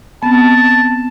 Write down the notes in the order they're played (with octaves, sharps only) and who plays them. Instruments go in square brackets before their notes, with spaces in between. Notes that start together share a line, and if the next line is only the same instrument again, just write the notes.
[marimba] B3 C4 [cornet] A5